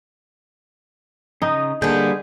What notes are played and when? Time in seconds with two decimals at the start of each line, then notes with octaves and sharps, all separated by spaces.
1.42 C#3 D#4 A#5 D#6
1.82 D3 G3 A#3 G#4 B4 G6